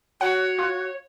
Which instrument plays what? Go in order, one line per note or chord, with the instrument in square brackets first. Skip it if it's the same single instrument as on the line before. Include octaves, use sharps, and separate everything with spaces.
[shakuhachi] F#4 [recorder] C#5 [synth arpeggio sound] F#5
[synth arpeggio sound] F4